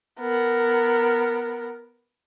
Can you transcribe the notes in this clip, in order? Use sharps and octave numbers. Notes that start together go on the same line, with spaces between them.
B3 A#4